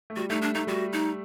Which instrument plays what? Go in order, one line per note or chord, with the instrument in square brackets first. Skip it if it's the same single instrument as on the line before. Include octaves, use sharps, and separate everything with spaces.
[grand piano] A3
[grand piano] G3 [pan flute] F#4
[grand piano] A3 [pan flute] D#4
[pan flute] D4
[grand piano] A3 [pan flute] D#4
[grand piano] G3 [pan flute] F#4
[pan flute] D#4